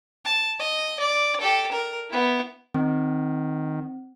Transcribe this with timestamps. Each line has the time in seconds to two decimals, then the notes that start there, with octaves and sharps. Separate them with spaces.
0.25 A5
0.59 D#5
1.00 D5
1.40 G4 A4
1.72 A#4
2.10 B3 E4
2.74 D#3 C4